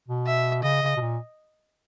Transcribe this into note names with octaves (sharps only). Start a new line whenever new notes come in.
B2
E5
C#3 D#5
C#3
B2
A#2